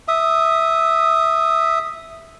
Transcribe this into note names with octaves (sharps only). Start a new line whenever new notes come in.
E5 D#6